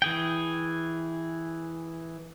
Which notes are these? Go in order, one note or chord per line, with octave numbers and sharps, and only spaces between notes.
E3 G#4 G5